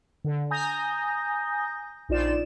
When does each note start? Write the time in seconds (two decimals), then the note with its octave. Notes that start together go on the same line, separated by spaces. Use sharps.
0.24 D3
0.51 G#5 A#5 D#6 G6 A#6
2.09 A#1 D#4 F4 D5 E7